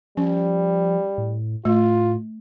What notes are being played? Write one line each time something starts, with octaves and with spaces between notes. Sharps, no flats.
F3 G3 C#4
A2
A2 A3 F4